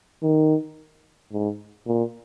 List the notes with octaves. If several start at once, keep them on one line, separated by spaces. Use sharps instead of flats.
D#3
G#2
A#2